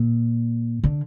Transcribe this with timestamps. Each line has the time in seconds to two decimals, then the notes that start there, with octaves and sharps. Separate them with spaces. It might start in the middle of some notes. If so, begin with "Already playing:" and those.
Already playing: A#2
0.84 D3